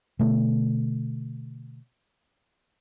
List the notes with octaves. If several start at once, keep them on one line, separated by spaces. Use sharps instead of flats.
B2 D3 A3